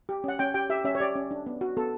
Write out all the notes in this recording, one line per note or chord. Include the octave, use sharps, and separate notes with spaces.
G4
C#4 F#5
C#4 G5
G4 G5
G4 E5
C#4 E5
C#5
G4 D5
C#4
D4
B3
F#4
B3 A4